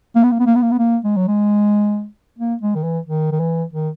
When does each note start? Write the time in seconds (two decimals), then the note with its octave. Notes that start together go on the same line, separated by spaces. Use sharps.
0.15 A#3
0.23 B3
0.31 A#3
0.39 B3
0.46 A#3
0.55 B3
0.62 A#3
0.71 B3
0.79 A#3
1.04 G#3
1.16 F#3
1.28 G#3
2.39 A#3
2.61 G#3
2.75 D#3
2.83 E3
3.07 D#3
3.32 D#3
3.40 E3
3.73 D#3